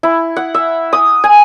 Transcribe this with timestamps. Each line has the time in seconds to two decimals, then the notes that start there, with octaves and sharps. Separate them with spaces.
0.03 E4
0.36 F#5
0.54 E5
0.93 D#6
1.24 G#5